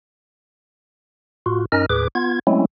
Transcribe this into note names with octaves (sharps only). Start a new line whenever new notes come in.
A2 F4 F#4
G2 C#4 D#4 A#4 D#5 F6
D#2 A2 G#4 B4 D6
B3 F4 G#6
F#3 G#3 A3 C4 C#4 E4